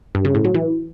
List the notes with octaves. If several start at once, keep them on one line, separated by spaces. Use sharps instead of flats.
G2
C#3
A2
F#3
E3